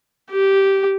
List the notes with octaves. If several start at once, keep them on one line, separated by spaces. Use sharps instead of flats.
G4